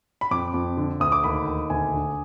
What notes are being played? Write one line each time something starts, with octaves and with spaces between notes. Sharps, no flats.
B5
F2 D6
F2
D3
D2 D#6
D6
D#2 B5
D#2
D2 G#5
D3